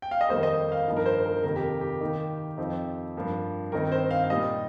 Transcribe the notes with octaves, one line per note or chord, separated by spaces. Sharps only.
G5
F5
D#5
F2 D#3 G3 A#3 D#4 C5
D#5
F5
G2 F3 A#3 D#4
A#4
C5
A#4
F2 C3 D#3 A#3 A#4
G4
G4
D#3 A#3 D#4
F2 F3 C4 D#4
G2 F3 A#3
G2 D#3 C4 D#4 A#4
C5
F5
F5
A#2 G3 D#4 D#5